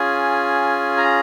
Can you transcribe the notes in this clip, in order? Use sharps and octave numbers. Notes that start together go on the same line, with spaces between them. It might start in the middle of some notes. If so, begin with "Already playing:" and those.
Already playing: C#4 F4 G#4 G#5
A#5